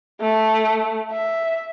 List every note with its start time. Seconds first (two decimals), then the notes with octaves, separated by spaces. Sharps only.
0.21 A3
1.12 E5